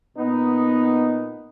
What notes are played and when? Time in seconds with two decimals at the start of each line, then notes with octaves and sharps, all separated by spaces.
0.16 A#2 B3 D#4